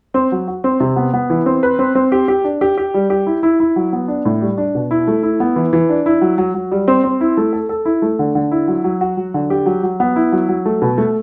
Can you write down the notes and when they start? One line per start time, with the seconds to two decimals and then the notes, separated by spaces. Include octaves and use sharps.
0.14 C4
0.32 F#3
0.48 F#4
0.64 C4
0.80 C3
0.96 B3
1.14 B3
1.30 E3
1.46 C4
1.63 B4
1.79 C4
1.95 C4
2.12 G4
2.28 G4
2.44 D4
2.61 G4
2.78 G4
2.94 G3
3.10 G4
3.27 E4
3.43 E4
3.60 E4
3.76 F#3
3.93 B3
4.08 D4
4.25 A2
4.42 G3
4.58 D4
4.75 B2
4.91 E4
5.08 A3
5.23 E4
5.40 B3
5.56 E3
5.73 E3
5.89 D4
6.06 E4
6.21 F#3
6.38 F#3
6.54 F#3
6.72 G3
6.88 C4
7.04 C4
7.21 E4
7.37 A3
7.53 A4
7.69 A4
7.85 E4
8.02 A3
8.19 D3
8.35 D3
8.51 E4
8.68 F#3
8.84 F#3
9.01 F#4
9.17 F#3
9.34 D3
9.50 G4
9.66 F#3
9.83 F#3
10.00 B3
10.16 E4
10.32 F#3
10.49 F#3
10.66 A3
10.82 B2
10.98 A3